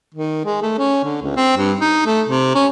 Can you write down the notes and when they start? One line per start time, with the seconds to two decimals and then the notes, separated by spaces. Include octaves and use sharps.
0.15 D#3
0.45 G#3
0.62 A3
0.78 C#4
1.04 D3
1.22 C#2
1.36 C4
1.57 G2
1.81 D#4
2.06 A3
2.28 C3
2.55 C#4